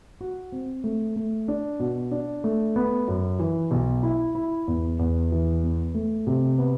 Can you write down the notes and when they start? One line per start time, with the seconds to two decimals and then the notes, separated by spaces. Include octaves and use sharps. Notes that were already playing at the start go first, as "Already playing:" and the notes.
0.21 F#4
0.52 C4
0.84 A3
1.16 A3
1.48 D4
1.80 B2
2.11 D4
2.44 A3
2.76 B3
3.08 F#2
3.39 E3
3.71 B1
4.03 E4
4.35 E4
4.67 E2
4.99 E2
5.32 E3
5.63 B3
5.94 A3
6.27 C3
6.58 B3